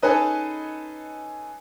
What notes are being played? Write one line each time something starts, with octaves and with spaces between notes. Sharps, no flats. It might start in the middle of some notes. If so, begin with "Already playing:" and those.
C#4 D#4 G#4 A4 B4 D#5